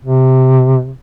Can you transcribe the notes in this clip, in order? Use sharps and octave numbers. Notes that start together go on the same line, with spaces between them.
C3